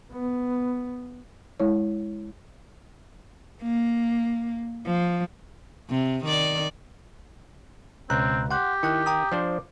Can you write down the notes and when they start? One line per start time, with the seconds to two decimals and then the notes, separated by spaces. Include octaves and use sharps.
0.13 B3
1.60 G#3 E4 C#5
3.63 A#3
4.87 F3
5.90 C3
6.25 D#3 D5
8.10 C#2 B2 C4 A#5 F#6
8.51 G4 F#5 C6 F#6
8.83 D#3 E4 G5 F#6
9.06 G5 A#5 D#6
9.32 F3 D4 C5 D6